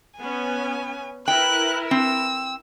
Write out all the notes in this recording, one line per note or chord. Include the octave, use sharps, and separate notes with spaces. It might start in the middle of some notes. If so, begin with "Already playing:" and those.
B3 C#4 G#5
E4 A#4 B4 G5 F#6
C4 E6